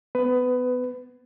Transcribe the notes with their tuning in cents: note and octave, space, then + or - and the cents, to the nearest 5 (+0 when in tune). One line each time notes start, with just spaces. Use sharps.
B3 +20 B4 +20